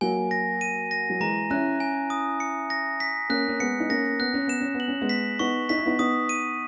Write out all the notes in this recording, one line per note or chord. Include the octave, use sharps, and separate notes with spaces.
F#3 A#3 G#5
A#6
D#7
A#6
F#3
E3 G#3 A#5
C#4 E4 F#6
G#5
D#6
C#7
A#6
B6
A#3 C#4 F#6
C#4
G#3 B3 C#7
D#4
A#3 C#4 A#6
B3 F#6
C#4
B3 E7
C#4
B3
F#7
C#4
G#3 B3
B6
B3 D#4 C#6
D#4 B6
E4
B3 D#4
B3 D#4 D#6
D#7